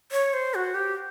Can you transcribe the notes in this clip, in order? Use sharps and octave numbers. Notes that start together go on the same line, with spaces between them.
C#5
C5
F#4
G4